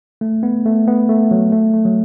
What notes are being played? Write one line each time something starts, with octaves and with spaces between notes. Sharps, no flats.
A3
B3
A3
B3
A3
F#3
A3
A3
F#3